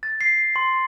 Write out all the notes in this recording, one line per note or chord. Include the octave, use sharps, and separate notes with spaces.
A6
C7
C6